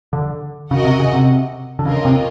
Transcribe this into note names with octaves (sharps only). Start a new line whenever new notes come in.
D3
C#3 F#4 A#4 D#5 F#5
C3
C#3
C3
D3
C#3 A#3 C#4 F4 A#4 D#5
C3